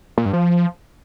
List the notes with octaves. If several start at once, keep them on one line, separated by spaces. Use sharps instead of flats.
A#2
G2
F3